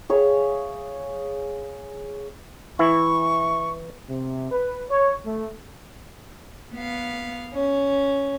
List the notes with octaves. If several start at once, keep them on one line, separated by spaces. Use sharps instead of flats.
G#4 C#5 E5 F5
E3 E4 C#6
C3
B4
C#5
A3
B3 F5
C#4